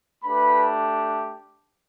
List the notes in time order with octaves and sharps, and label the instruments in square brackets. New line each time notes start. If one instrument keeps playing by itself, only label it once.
[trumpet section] A3 D4 G4 B4 B5